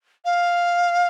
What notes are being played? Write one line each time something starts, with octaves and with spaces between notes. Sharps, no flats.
F5